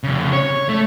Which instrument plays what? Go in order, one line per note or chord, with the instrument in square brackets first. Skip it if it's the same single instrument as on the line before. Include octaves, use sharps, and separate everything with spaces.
[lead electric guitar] F2 C#3
C#5
A3